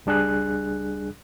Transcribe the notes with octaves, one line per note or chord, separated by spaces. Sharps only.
C#2 G3 D4 G#4 F#6